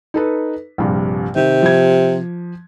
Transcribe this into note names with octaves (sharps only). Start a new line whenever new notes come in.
D#4 A4 B4
A#1 G2 C3
C3 D#3
F3 G#6